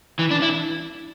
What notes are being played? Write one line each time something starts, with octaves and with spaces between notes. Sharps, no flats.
E3
D4
E4